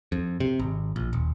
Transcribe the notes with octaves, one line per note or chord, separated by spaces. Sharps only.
F2
C3
G#1
A#1
D#1